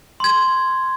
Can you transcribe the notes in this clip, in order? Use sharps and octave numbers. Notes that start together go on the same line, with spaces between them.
C6 G#6